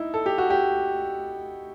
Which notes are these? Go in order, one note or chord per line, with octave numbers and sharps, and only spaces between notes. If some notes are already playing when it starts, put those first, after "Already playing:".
Already playing: D#4 E4
A4
G4
F#4
G4